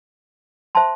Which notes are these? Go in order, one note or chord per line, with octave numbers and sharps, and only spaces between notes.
C5 E5 A5 C6